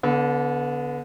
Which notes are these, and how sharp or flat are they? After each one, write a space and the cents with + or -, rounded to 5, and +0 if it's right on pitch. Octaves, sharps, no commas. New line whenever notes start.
D3 -30 B3 +0